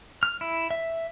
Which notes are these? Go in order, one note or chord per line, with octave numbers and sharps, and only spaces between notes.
F6
E4
E5